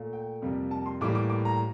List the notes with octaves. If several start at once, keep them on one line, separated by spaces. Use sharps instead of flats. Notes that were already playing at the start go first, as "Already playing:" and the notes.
Already playing: A#2 A3
G5
F2 C3 G3 A#3
A5
C6
A2 E3 G3 A#3 D6
D6
D6
A#5